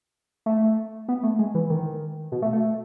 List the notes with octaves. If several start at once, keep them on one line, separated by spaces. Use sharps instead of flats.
A3
B3
A3
G#3
E3
D#3
B2
A3
A3